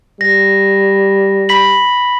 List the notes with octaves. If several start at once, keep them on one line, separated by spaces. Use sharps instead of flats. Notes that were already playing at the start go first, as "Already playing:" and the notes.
G3 A#6
B5 B6 F#7